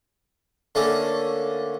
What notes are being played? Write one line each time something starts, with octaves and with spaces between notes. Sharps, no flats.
D3 A3 A#3 C#4 A4